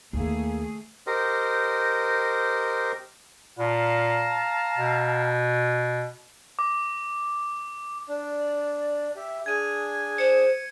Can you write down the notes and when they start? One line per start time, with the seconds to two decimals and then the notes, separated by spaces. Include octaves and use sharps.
0.13 D#2 D#3 A3 A#3 G#4
1.07 G4 A#4 C5 D#5
3.59 A#2 F5 A5 A#5
4.77 B2
6.59 D6
8.08 D4 D5
9.16 G4 E5
9.46 D4 G#4 G#5 G#6 D#7
10.18 C5 C#7